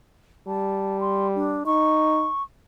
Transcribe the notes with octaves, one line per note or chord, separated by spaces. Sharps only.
G3 A5
C6
D4
D#4 C#6